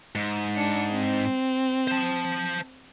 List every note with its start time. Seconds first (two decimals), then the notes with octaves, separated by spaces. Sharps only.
0.15 G#2
0.57 D4 C#7
0.92 C4
1.88 C5 A5